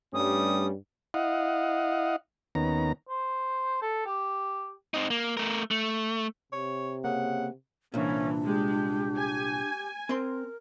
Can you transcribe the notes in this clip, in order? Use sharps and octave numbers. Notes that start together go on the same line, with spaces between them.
G2 G3 A3 C#4 D#6
E4 D#5 F5 F#5
D#2 D#3 B3 C#4 A#5
C5
A4
G4
C4 D#4
A#3
A3 A#4
A3
C3 C#5
C#3 A#3 F#5
C2 A#2 E3 C#4 D4
G#3 G4
G#5
C4 A#4 C6